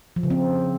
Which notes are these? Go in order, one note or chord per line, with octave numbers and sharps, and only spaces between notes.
F3
C#3
C4